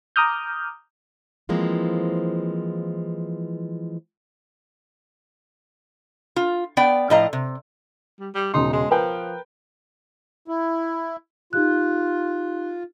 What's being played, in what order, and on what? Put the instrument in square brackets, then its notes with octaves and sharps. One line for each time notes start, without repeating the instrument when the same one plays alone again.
[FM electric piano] A#5 D6 D#6 F6 G6
[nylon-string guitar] E3 F3 G#3 A#3 C4
[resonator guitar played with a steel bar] F4
B3 D5 G5
A2 F3 D#5 F5 A#5
C3
[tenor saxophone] G3
G3
[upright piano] E1 C#3 C6 [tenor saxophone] D#4
[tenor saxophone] G#3
[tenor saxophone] F3 [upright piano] A#4 B4 G5
[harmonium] E4
[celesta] D#4 G4 F#6 [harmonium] F4